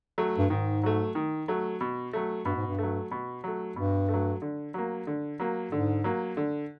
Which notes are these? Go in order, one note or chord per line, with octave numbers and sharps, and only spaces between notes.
F#3 A3
G2
G#2 D#3
F#3 A3
D#3
F#3 A3
B2
F#3 A3
G2 B2
G#2
G2
F#3 A3
B2
F#3 A3
G2 B2
A3
F#3
D3
F#3 A#3
D3
F#3 A#3
G#2 D3
F#3 A#3
D3